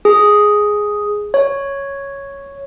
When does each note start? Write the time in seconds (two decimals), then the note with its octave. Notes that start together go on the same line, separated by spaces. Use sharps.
0.05 G#4
1.34 C#5